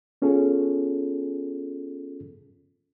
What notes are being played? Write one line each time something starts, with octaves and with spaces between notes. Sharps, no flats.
B3 C#4 F4 G#4 A4